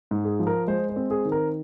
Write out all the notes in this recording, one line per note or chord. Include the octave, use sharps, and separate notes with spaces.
G#2
G#4
F3
A#4
G#3 C5
C5
C4
G#4
D#3
A#4